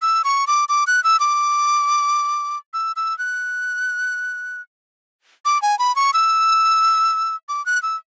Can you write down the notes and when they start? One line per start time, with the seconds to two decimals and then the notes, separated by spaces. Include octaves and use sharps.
0.02 E6
0.24 C#6
0.47 D6
0.69 D6
0.87 F#6
1.04 E6
1.20 D6
2.73 E6
2.96 E6
3.19 F#6
5.45 D6
5.62 G#5
5.79 B5
5.96 C#6
6.13 E6
7.49 D6
7.66 F#6
7.83 E6